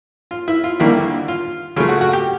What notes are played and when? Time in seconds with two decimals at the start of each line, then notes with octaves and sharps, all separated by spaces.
0.31 F4
0.48 E4
0.64 F4
0.80 D#2 D3 G3 A#3 D4 E4
1.28 F4
1.76 C#3 F#3 A3 F4
1.89 F#4
2.01 F#4
2.13 G4